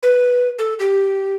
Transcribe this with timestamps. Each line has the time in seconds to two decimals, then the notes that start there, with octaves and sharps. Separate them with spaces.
0.03 B4
0.59 A4
0.79 G4